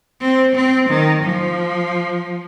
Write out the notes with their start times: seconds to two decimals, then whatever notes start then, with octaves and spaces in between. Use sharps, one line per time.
0.22 C4
0.55 C4
0.89 D#3
1.24 F3